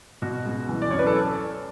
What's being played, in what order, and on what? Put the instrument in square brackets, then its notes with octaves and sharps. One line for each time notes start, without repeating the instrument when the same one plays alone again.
[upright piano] B2 F#4
C#2
E3
D5
F#2 C#5
B4
A4